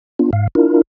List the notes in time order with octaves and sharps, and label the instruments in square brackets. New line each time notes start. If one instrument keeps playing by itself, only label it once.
[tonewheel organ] B3 D4 F4
G#2 F5
D4 E4 F4 A#4